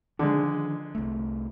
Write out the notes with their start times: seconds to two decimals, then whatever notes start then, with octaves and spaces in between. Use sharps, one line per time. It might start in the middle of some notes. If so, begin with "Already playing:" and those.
0.19 D3 D#3 F3 G#3 D4
0.95 C2 A3